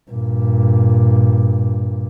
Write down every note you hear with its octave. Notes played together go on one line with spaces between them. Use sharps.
G2 A#2